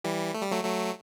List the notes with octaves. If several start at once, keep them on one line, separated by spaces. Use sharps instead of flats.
E3 G3
A3
G3
F#3 A3
F#3 A3